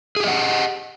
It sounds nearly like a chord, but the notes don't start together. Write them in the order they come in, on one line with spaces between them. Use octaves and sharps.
G#4 G4 D#5 F#5